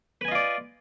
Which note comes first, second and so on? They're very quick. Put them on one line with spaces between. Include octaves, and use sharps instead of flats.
B4 G#5 D#5 F4 D5